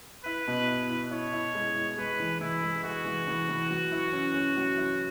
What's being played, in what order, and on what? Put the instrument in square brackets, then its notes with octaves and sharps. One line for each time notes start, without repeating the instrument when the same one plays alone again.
[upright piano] E4 [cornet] B4
[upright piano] B2
E4
E4
[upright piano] E4 [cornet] C#5
[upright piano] E4
G#3
E4
[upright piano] G#3 [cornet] B4
[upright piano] E3
[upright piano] E3 [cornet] E4
[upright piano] G#3
[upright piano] G#3 [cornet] F#4
[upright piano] E3
E3
E3
F#3
E4
C#4
C#4
F#3
E4